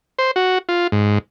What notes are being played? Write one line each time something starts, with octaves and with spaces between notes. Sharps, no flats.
C5
F#4
F4
G#2